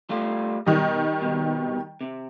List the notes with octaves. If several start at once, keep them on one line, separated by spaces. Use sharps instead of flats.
G3 A3 F4
B2 D#3 G3 D#5
C2 B2
C3